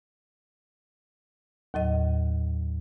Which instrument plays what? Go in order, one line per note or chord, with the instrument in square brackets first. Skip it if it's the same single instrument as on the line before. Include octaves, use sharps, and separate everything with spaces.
[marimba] D#2 A2 F#3 D#5